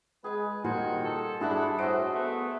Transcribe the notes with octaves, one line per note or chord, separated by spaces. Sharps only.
G#3 G#4 B4 G#5
A#2 D#3 F3 G3 F#4 C5 G#5
A4
G2 D4 E4 F#4 G#4 A4
A2 F#4 C5 D#5 E5 D7
A3 B3